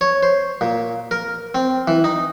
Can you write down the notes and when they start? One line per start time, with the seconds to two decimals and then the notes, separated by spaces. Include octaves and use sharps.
0.01 C#5
0.23 C5
0.61 A#2
1.11 A#4
1.55 C4
1.88 E3
2.04 D#4